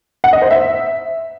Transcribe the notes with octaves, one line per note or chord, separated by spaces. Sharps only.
F#5
D#5
C5
E5